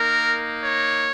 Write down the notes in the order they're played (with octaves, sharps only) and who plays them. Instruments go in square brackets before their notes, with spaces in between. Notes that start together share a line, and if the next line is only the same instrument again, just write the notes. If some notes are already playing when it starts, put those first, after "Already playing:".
Already playing: [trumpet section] A#3 D#4 A#4
C#5